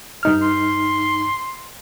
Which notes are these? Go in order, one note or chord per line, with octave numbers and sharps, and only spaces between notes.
G2 D#4 F6
C6